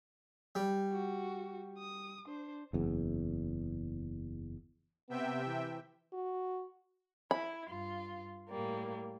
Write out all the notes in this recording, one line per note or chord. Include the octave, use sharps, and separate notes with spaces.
G3
F#4
D#6
D4 C5
F#1 E2
C3 B3 E5 G5
E3
F#4
E4 B5
G2 F4
A2 G3 A#3